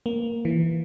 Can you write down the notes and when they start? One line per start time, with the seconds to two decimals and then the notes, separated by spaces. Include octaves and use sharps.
0.06 A#3
0.45 E3